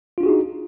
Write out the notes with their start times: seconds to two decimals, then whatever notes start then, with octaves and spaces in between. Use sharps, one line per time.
0.18 F4
0.20 D4
0.23 F#4
0.26 G#4
0.29 D#4